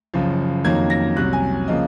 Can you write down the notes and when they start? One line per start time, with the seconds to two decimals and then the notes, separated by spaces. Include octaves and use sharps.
0.14 F#1 F#2 F3
0.64 F2 D#3 F#3 A#3 G#6
0.90 A#6
1.16 C2 C3 F#3 F#6
1.33 G#5
1.68 C#3 F3 A#3 D#5